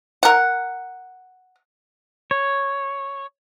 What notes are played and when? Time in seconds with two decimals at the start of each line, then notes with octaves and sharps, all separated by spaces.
0.23 A#4 F#5
2.31 C#5